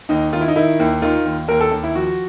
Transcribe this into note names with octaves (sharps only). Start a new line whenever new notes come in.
D#2 D#4
D#3 F4
E4
D#4
D#3 E4
D#2
D#3 F4
D#2
D#2 A#4
A4
D#2
E4
F3 F#4